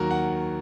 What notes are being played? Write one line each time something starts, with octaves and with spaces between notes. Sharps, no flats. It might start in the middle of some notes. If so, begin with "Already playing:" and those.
Already playing: D#2 D#3 F#3 F#4 A#4
F#5